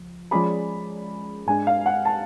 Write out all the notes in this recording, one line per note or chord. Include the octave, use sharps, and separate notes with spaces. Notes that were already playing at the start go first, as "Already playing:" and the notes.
Already playing: C#2 F3
F3 G#3 C#4 G#4 D5 B5
G#2 G#3 D4 G#5
F5
F#5
A5